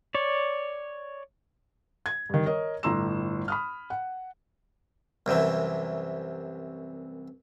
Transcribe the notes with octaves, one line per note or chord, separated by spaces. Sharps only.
C#5 D5
G#6
G2 D#3
A#4 C#5 D#5
G1 A2 A#5 C6 E6 E7
B5 D#6 F6
F#5
C2 F#2 C3 E3